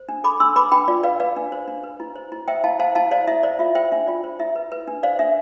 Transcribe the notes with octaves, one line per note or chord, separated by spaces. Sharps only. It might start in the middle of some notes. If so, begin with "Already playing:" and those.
Already playing: C5
D4
A4 B5 D6
D4 C6 E6
B4 B5 D6
D4 G5 B5
F4 D5
B4 D5 F5
B4 D5 F5
D4
C5
D4
B4
E4
C5
E4
C5 E5 G5
E4 F5 A5
C5 F5 A5
E4 F5 A5
C5 D5 F5
E4 E5
C5 D5
F4 E5
C5 E5 G5
D4 E5
F4 D5
C5
E4 E5
B4
B4
D4
C5 D5 F5
D4 E5